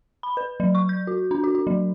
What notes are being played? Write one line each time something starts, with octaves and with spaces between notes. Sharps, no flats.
B5
B4
F#3
C#6
G6
F#4
D4
F#4
F#4
F#3